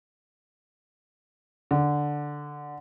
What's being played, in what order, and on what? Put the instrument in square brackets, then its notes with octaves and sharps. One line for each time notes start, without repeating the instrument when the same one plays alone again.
[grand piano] D3